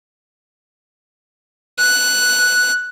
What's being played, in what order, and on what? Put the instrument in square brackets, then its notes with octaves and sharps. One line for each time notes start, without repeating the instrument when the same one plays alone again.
[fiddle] F#6